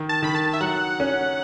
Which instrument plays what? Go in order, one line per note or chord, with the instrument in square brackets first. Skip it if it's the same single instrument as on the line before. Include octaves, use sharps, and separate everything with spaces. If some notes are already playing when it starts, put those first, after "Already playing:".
Already playing: [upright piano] D#3
[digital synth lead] A5
[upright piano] D#3 [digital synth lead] B5
[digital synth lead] A5
E5
[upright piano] F#3 [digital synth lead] F#5
[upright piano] C#4